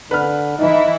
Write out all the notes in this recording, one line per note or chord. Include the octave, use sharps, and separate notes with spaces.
D3 B4 F6
E3 D#4 E4